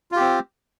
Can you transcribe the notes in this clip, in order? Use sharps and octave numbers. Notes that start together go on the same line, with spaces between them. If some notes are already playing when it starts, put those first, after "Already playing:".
C4 F4 G4